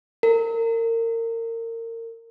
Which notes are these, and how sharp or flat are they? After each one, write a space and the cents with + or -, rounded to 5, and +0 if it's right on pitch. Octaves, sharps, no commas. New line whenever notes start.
A#4 -30